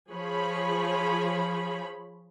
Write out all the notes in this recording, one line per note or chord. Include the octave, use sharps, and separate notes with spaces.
F3 G#4 C#5 B5